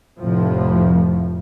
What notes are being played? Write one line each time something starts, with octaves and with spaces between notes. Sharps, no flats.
F1 F2 A2 F3